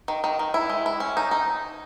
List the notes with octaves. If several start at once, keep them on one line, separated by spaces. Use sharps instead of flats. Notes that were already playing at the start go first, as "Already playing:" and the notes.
D#3
D#3
D#3
E4
G#3
E4
C#4
D#4
D#4